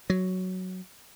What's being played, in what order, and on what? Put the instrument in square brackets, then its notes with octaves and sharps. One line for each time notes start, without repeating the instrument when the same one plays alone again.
[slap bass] F#3